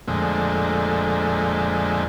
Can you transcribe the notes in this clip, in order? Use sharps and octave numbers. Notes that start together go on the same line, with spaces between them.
F2 A#2 D3 G#3 A3